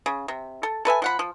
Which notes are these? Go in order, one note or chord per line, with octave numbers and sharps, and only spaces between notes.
C#3
C3
A4
A4 B4 E5 G#5
F3 F#5 B5
F3